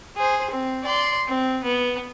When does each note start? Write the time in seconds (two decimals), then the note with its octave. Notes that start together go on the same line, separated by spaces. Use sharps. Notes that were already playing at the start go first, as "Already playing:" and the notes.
0.16 G#4 C5
0.51 C4
0.83 D5 C6
1.27 C4
1.63 B3